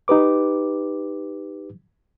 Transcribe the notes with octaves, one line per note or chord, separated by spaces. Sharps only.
D#4 G4 B4 D6